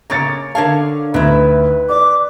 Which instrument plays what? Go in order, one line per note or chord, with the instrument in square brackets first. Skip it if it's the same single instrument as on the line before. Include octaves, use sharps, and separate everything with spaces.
[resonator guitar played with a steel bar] C#3 A#3 C#5 [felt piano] A#5 A6 C#7
[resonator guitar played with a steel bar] D3 C#5 F5 [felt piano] A#4 A5
[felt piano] D2 [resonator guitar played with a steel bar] D#3 E4 [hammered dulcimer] B4
[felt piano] D5 [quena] D6